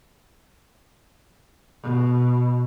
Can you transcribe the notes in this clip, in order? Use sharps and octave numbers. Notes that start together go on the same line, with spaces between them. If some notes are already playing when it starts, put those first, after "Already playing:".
B2